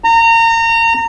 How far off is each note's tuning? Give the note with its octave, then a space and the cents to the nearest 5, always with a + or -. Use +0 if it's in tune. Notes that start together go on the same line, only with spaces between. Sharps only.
A#5 -30